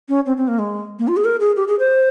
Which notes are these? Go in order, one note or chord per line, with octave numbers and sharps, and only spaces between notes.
C#4
C4
C4
A#3
G#3
A#3
F4
G#4
A#4
G#4
G4
G#4
C5